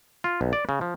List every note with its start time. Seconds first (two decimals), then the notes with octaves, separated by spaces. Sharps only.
0.24 F4
0.41 B1
0.53 D5
0.69 C#3
0.81 F3